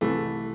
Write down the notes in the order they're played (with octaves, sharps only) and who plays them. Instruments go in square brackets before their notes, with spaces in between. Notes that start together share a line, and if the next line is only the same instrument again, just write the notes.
[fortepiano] C2 C3 E3 A3